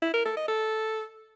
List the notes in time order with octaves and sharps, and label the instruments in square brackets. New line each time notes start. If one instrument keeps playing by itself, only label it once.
[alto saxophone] E4
A#4
A4
D#5
A4